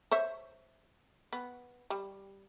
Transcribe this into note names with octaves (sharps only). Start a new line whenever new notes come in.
C5 C#5 E5
B3
G3